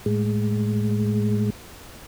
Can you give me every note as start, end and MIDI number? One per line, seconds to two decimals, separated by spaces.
0.06 1.50 45
0.06 1.50 56